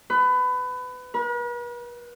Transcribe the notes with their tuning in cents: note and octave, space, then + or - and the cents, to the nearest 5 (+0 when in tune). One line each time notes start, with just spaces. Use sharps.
B4 +25
B4 -45